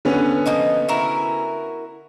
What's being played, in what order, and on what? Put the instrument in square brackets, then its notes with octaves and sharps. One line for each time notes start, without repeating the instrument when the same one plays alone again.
[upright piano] D3 B3 C#4
[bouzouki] F3 A#3 D#5
E4 F#4 A#4